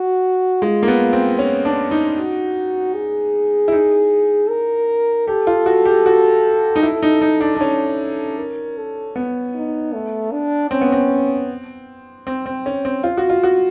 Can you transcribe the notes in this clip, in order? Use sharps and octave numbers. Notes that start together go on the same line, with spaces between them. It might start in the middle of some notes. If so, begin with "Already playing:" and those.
Already playing: F#4
G#3 F4
A#3
B3
C4
C#4
D4
D#4
F#4
G#4
E4
D#4
A#4
G4 A4
F4
F#4
G4
F#4
D#4
E4 A4
D#4
D#4
D4
D4
C#4 A4
A#4
A4
B3
D#4
A3
D4
C4 C#4
B3
C4
C4
C4
C#4
C4
F4
F#4
F4
F#4